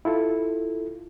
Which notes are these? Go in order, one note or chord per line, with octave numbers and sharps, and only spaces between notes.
E4 F4 A4